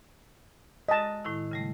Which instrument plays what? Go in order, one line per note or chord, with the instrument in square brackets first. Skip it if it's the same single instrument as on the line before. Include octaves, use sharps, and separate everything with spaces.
[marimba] G#3 F#4 [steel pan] D#5 A5
[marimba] A2 D#3 E4
C#3 G3 A3